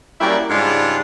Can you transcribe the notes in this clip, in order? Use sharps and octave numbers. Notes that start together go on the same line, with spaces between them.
F#2 G3 A#3 E4 D5 G5
G#2 C#3 G3 G#3 D4 F4